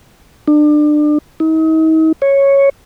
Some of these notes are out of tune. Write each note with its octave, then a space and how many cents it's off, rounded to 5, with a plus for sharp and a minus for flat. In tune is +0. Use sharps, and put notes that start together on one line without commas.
D4 +30
D#4 +40
C#5 -5